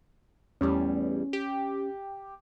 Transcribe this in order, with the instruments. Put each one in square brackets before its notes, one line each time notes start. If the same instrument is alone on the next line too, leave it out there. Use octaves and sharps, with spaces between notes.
[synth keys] E2 A2 G3 [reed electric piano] C#4
[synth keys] G4